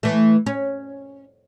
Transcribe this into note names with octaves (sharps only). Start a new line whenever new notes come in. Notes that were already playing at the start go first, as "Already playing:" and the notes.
E3 A3
C#4